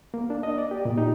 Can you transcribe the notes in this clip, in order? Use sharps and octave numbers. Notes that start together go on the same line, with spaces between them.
A#3
D4
D#5
D5
G4
A#2
D#4